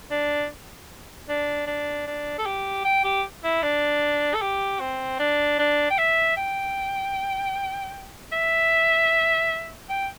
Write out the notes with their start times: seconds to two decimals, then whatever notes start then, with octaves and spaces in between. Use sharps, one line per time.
0.11 D4
1.29 D4
1.67 D4
2.07 D4
2.39 A4
2.46 G4
2.85 G5
3.04 G4
3.44 E4
3.63 D4
4.34 A4
4.42 G4
4.80 C4
5.19 D4
5.59 D4
5.90 G5
5.98 E5
6.37 G5
8.32 E5
9.89 G5